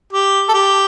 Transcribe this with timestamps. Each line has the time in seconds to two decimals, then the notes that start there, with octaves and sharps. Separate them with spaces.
0.13 G4
0.49 A4
0.53 G4